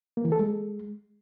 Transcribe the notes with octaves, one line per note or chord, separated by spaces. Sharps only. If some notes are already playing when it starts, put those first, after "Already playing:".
A#3
E3
A4
G#3